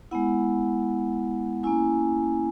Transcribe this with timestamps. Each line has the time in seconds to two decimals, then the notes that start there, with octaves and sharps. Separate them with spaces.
0.11 G#3 B3 E4 F#5
1.63 A#3 C#4 E4 G#5